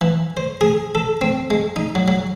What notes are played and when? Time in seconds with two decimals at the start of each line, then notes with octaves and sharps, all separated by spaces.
0.01 E3
0.37 C5
0.61 G#4
0.95 A4
1.21 C4
1.50 G#3
1.76 D#4
1.95 F#3
2.08 F#3